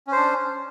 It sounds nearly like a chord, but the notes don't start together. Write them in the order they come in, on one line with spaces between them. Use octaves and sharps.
C#4 C5 D4